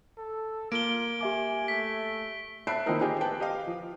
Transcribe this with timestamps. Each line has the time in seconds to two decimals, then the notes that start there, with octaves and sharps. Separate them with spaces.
0.18 A4
0.72 A#3 F4 D7 G7
1.21 G4 E5 G#5 D6
1.68 A3 B6
2.67 E5 A5 B5 F#6 C7 D7
2.86 D#3 F3 A#3 C4 D#4 A#4
3.00 C4 F4 G4 G#4 D#5
3.21 B4 G5 A5
3.40 G4 D#5 F5
3.67 F3